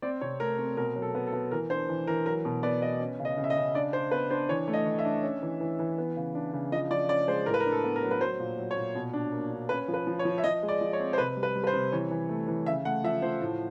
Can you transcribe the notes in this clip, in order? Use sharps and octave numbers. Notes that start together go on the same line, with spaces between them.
C4 D5
C3 C#5
A3 A#4
C4
B2 A#4
F#3
A4
B3
A4
B3
E3 A#4
D4 C5
E3
E3 A#4
F#3 A#4
B2
B3 D5
B3 D#5
C#4
C#3
D#5
C#3
E5
D#5
C#3
D4 D5
D4 C5
B3 B4
D4 C5
E3 C#5
A3
D#5
E3
E5
D4
C#4
E3
E3
E3
B3
C#3
D4
C#3
F3 D#5
F3 D5
C#4 D5
G#3 C5
A2 A#4
B4
A#4
D4
A4
B3
A#4
F#3
B4
F#3 C5
A#2
F#3
C#5
A#2
B2
D4
A#3
D4
C#4 B4
F3
B4
F3
C#5
F3
E5
F3 D#5
G#3
D5
F3
C#5
C4
C5
C3 B4
G3
B4
G3
B4
C5
C3
E3 C#5
E3
A3
E3
C#3 E5
A3 F#5
F3 E5
F3 C5
A2